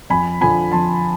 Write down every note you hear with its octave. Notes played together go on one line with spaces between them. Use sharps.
F2 G#5 B5
D3 F3 G#5 B5
F2 A5 C6